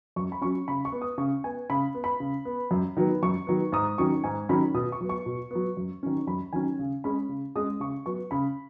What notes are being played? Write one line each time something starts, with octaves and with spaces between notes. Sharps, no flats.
F#2 C#6
B5
F#3 C#4 C#6
C#3 B5
C#6
B3
D#6
C#3 C#6
B3 G#5
C#3 B5
B3
B5
C#3
B3
F#2
D#3 F#3 B3
F#2 C#6
D#3 F#3 B3
G#2 D#6
D#3 F#3 C#4 C#6
G#2 G#5
D#3 F#3 C#4 B5
B2 D#6
C#6
F#3 B3
C#6
B2
F#3 B3
F#2
D#3 F#3 C#4
F#2 B5
D#3 F#3 C#4 G#5
C#3
G#3 C#4 B5
C#3
G#3 C#4 D#6
C#3 C#6
F#3 B3 C#6
C#3 B5